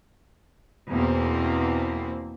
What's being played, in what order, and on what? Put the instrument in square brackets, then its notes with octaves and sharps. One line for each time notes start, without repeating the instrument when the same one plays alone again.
[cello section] E2 B2 A#3 C4